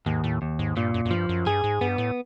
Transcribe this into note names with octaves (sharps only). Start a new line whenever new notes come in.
D#2 G#2
A2
D#2
G#2
G2 A#2
F#2
F#2
G2 F3
F#2
G2 G#4
G#2
G2 B3
A2